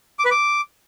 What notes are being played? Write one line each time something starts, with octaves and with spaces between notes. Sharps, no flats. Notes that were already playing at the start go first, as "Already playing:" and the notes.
D6
B4
D6